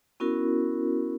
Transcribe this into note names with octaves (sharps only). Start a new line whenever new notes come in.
B3 C#4 E4 F#4 A#4